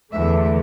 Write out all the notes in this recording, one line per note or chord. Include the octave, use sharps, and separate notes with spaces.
E2 D3 A3 E5